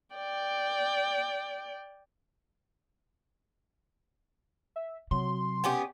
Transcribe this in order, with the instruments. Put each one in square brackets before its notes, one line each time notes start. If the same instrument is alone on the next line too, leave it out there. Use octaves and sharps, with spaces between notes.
[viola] D5 G5
[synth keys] E5
[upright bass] C3 [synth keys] F#3 [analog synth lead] C6
[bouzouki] B3 C#4 G4